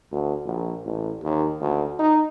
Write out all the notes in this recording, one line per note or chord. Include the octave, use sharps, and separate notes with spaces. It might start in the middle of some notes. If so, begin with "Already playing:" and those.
D2
A#1
A1
D#2
D2
D#4